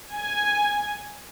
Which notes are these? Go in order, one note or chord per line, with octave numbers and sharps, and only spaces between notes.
G#5